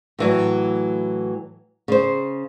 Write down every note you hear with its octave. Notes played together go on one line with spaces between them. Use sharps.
A2 E3 F#3
C#3 C5